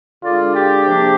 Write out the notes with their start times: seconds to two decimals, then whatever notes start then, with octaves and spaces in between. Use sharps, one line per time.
0.23 D3 G#3 D4 F4 G#4 D5
0.55 G4
0.86 C3 F3 A#3 D4 G#4